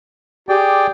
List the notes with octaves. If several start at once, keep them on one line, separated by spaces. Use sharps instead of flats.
G4 G#4 D5 G5